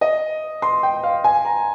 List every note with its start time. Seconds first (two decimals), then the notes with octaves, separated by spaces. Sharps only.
0.01 D#5
0.62 C6
0.83 G5
1.03 F5
1.24 G#5
1.45 A#5